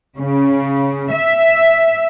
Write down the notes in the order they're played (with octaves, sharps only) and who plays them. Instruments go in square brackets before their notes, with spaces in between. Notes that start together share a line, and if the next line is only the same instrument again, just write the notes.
[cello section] C#3
E5